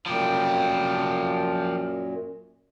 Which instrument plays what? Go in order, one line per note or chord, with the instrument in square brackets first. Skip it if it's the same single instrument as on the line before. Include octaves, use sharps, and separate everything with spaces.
[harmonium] F#2 A#2 [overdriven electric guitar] F3 G4